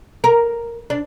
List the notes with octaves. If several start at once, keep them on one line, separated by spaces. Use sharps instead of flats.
A#4
D4